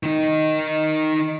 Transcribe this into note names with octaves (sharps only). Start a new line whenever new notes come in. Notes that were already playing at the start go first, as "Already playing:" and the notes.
D#3 D#4